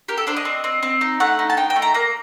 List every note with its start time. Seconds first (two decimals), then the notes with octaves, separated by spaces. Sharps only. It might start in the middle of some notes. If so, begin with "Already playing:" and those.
0.08 G4 A#4
0.18 A4
0.27 D4 C5
0.36 D#5
0.45 C4
0.64 C4
0.83 C4
1.01 D#4
1.20 A3 F#5
1.39 D#4
1.50 A5
1.57 D#4 G5
1.70 G5
1.76 A3
1.82 A#5
1.94 A#3 A#5